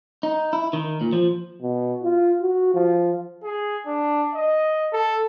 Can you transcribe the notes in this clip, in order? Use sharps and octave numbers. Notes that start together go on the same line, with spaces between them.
D#4
E4
D#3
A#2
F3
B2
F4
F#4
F3
G#4
D4
D#5
A4